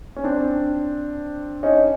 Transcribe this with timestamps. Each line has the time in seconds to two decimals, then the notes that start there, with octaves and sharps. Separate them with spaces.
0.16 C#4
0.24 C4 D4
1.63 C#4 D#4